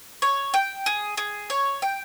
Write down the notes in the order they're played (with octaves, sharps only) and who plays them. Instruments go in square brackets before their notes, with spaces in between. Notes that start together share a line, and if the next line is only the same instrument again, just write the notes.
[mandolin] C#5
G5
G#4
G#4
C#5
G5